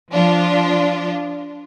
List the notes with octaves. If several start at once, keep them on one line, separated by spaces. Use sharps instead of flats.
F3 D4 F4